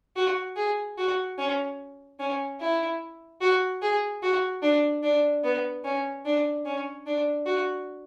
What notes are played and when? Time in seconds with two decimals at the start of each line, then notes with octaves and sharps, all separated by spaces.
0.16 F#4
0.56 G#4
0.98 F#4
1.38 C#4
2.20 C#4
2.60 E4
3.41 F#4
3.82 G#4
4.23 F#4
4.62 D4
5.03 D4
5.44 B3
5.84 C#4
6.26 D4
6.66 C#4
7.06 D4
7.46 F#4